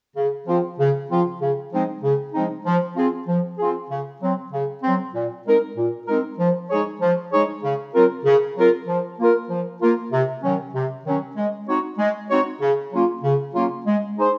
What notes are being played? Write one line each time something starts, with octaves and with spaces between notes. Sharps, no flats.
C#3
F3 C4 F4
C#3
F3 C4 F4
C#3
F3 G#3 C4 D#4
C#3
F3 G#3 C4 D#4
F3
C4 F4 G#4
F3
C4 F4 G#4
C#3
F#3 C4
C#3
F#3 C4
A#2
G#3 C4 D#4 A#4
A#2
G#3 C4 D#4 A#4
F3
G#3 D#4 G#4 C#5
F3
G#3 D#4 G#4 C#5
C#3
F#3 C4 F4 A#4
C#3
F#3 C4 F4 A#4
F3
A#3 F4 A#4
F3
A#3 F4 A#4
C3
D#3 F#3 C#4
C3
D#3 F#3 C#4
G#3
C4 D#4 F#4 C#5
G#3
C4 D#4 F#4 C#5
C#3
F#3 A#3 C#4 F4
C#3
F#3 A#3 C#4 F4
G#3
D#4 G#4 C5